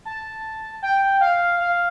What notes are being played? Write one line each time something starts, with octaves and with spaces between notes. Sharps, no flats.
A5
G5
F5
F5